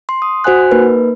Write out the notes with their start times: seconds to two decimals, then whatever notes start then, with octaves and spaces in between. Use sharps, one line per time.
0.09 C6
0.22 D#6
0.44 F#4 C5 F#5 G#5 F#6
0.71 A#3 D#4 A#4 B4